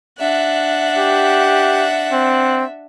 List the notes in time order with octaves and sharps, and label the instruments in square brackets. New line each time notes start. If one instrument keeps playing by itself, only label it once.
[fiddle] D4 F#5 [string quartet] E5
[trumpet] G4
C4